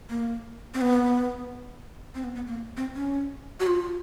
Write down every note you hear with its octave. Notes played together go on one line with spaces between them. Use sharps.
A#3
C4
B3
C4
B3
B3
A#3
C4
C#4
F#4
F4